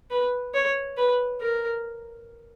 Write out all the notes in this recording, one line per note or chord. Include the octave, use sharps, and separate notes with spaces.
B4
C#5
B4
A#4